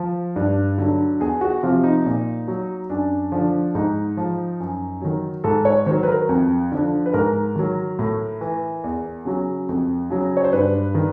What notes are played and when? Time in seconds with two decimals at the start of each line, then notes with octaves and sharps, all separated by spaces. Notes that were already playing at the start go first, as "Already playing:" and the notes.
Already playing: F3
0.36 G2
0.78 D3 F#3
1.20 E2 G#4
1.41 F#4
1.63 C3 F3 F4
1.84 D#4
2.06 A#2
2.48 F#3
2.90 F#2 D4
3.32 D3 F3
3.75 G#2 D#4
4.17 F3
4.60 F#2
5.02 D#3 F#3
5.44 G#2 A4
5.65 C#5
5.86 D#3 F#3 C5
6.03 B4
6.08 A#4
6.29 F2
6.72 D3 F3
7.06 B4
7.13 G#2 A#4
7.56 D#3 F#3
7.99 A2
8.41 E3
8.84 E2
9.25 C#3 F#3
9.69 F2
10.10 C#3 F#3
10.37 C#5
10.44 C5
10.53 G2 B4
10.95 D#3